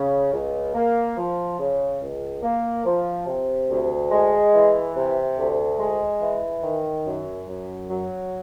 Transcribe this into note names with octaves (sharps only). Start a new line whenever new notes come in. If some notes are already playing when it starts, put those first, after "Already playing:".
Already playing: C#3
C#2
A#3
F3
C#3
C#2
A#3
F3
C3
D2
G#3
E3
C3
D2
G#3
E3
D#3
F#2
F#2
F#3